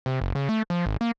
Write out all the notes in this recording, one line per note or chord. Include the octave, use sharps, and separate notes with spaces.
C3
F#1
C#3
A3
F3
G#1
A#3